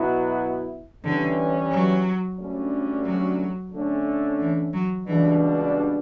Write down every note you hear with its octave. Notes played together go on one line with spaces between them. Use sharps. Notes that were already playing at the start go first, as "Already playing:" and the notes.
Already playing: B2 F#3 B3 E4
D3 E3 G3 C#4
F#3
D2 D3 G3 C#4
F#3
D3 A3 C#4
E3
F#3
C#2 B2 E3 G3 D4